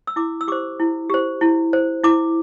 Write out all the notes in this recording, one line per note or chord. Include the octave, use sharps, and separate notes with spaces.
E6
E4 D6
E6
G4 C5 D6
E4
G4 C5
E4
C5
E4 D6